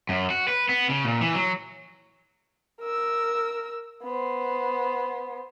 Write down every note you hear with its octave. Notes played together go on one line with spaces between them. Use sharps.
F#2
F#4
B4
B3
C#3
A#2
E3
F#3
A#4 E6
B3 C5